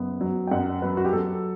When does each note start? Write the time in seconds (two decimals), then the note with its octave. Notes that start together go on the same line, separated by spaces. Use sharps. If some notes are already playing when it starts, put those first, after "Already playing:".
Already playing: F#1 B3
0.21 F#3
0.47 G5
0.51 F#2 F#5
0.82 F#3 B4
0.97 F#4
1.05 G4
1.13 F#3 A4